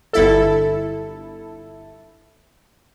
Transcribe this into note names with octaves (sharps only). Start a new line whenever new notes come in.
G1 E4 A4